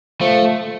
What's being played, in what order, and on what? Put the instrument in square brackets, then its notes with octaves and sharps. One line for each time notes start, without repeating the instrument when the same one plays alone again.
[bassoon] F3 [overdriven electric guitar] A3